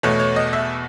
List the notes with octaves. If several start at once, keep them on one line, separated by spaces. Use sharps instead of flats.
E2 B2 A3 C#5
C#5
D#5
E5